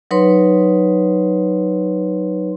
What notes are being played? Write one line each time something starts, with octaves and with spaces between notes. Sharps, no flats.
F#3 D#4 B4 C#5 C6